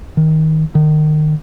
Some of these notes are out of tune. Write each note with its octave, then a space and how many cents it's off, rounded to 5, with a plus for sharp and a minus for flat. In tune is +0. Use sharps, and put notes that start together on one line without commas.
D#3 +15
D#3 -30